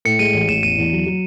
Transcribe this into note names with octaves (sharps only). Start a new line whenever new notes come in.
A2 C#7
G#3 D#7
A1
A1 E7
E2 D#7
E2
F#3
F#3